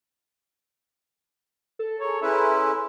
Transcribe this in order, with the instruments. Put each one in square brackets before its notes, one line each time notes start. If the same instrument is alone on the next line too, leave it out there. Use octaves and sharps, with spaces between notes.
[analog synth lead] A4
[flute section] G#4 A#4 A#5 [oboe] C#5
[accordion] C#4 E4 B4 [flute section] G#4 A#5 C6 [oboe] E5